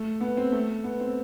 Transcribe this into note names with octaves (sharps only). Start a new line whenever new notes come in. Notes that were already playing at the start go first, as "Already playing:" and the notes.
Already playing: A3
B3
C4
A3
B3
C4